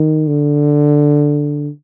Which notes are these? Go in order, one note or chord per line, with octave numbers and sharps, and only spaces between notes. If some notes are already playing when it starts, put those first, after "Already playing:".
Already playing: D#3
D3